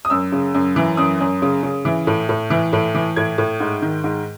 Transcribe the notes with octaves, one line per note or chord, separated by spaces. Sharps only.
D#6
F#2 E6
C#3
F#2
E3
F#2 D#6
F#2
C#3
C#3
E3
A2
A2
E3
A2
E3
A2 G#6
A2
G#2
D#3
G#2